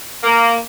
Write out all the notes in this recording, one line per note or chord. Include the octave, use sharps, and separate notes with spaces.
A#3